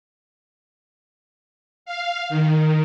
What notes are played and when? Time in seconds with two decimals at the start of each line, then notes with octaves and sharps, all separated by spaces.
1.86 F5
2.29 D#3